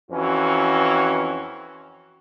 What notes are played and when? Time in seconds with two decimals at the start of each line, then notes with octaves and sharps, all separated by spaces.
0.11 F2 E3 C#4 F#4